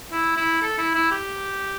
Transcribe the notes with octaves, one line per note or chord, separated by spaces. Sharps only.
E4
E4
A4
E4
E4
G4